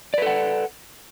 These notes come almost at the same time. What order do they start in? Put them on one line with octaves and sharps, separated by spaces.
D5 B4 A4 F#5